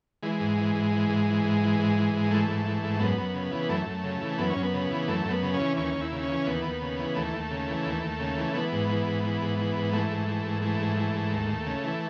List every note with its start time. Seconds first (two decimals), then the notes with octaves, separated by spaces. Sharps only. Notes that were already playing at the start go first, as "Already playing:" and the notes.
0.23 E3 G#3
0.40 G#2
0.57 E3
0.75 G#2
0.92 E3
1.09 G#2
1.27 E3
1.44 G#2
1.62 E3
1.79 G#2
1.96 E3
2.13 G#2
2.31 E3 A3
2.48 G#2
2.65 E3
2.82 G#2
3.00 F#2 B3
3.18 F#2
3.34 C#3
3.51 E3
3.69 F#2 A3
3.86 F#2
4.03 C#3
4.21 E3
4.38 F#2 B3
4.50 C#4
4.56 F#2
4.63 B3
4.74 C#3
4.91 E3
5.08 F#2 A3
5.25 F#2
5.30 B3
5.42 C#3
5.54 C#4
5.59 E3
5.77 D#2 C#4
5.95 D#2
6.01 E4
6.12 C#3
6.23 C#4
6.29 E3
6.46 D#2 B3
6.64 D#2
6.82 C#3
6.99 E3
7.16 D#2 A3
7.33 D#2
7.51 C#3
7.68 E3
7.85 D#2
8.02 D#2
8.20 C#3
8.37 E3
8.54 E3 B3
8.72 G#2
8.89 E3
9.07 G#2
9.24 E3
9.41 G#2
9.58 E3
9.76 G#2
9.93 E3 A3
10.10 G#2
10.28 E3
10.45 G#2
10.62 E3 A3
10.80 G#2
10.97 E3
11.15 G#2
11.32 D#2
11.49 D#2
11.66 C#3
11.84 E3